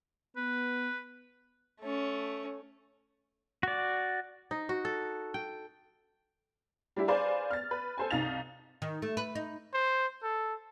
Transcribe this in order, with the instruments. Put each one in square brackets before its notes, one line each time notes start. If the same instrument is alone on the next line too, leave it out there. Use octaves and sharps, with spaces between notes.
[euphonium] B3 [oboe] B4
[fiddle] A3 C#4
[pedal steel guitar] F#4 D5
[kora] D#4
F#4
A4
G5
[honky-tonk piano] G3 D4 E4 G4
G#4 B4 C5 D5 F5 G#5
F6 A6
B4
A4 C5 G#5
C2 D#4 F5 A6 F7
[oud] D#3
A3
B4
D#4
[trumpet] C5
A4